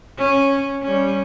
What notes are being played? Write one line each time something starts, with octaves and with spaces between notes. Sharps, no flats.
C#4
G3 C#4